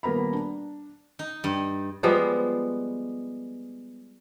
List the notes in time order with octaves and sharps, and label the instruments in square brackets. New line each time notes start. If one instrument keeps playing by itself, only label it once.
[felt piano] D#1 A#3 B3 A#5 B5
D4
[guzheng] D#4
G2
[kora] F3 G3 G#3 B3